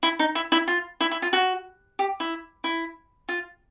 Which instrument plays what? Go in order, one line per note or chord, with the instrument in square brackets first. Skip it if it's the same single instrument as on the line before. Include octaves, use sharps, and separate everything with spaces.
[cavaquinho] E4
D#4
E4
E4
F4
E4
E4
F4
F#4
G4
E4
E4
F4